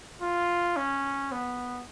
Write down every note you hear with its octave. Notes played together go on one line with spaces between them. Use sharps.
F4
C#4
B3